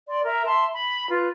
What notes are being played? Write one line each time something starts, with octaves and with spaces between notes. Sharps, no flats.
D5 C6
A#4 E5
E5 A5 C6
B5
F4 B4